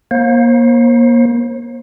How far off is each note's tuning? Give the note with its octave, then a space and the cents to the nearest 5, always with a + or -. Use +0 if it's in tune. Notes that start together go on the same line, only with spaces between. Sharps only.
A#3 +30 C5 +40